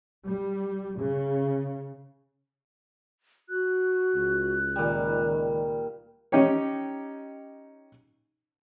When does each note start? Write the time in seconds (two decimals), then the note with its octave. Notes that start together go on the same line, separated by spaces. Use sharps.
0.25 G3
0.98 C#3
3.49 F#4 F#6
4.15 C#2
4.76 A#2 D#3 G3
6.32 C#4 D#4 G4 C#5